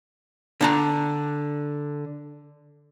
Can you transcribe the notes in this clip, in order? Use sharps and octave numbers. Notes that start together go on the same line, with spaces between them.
D3 D4 A#5